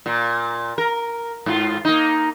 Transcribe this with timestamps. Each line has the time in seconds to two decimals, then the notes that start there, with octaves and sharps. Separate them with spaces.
0.06 A#2
0.78 A#4
1.46 G#2 F4
1.85 A#3 D#4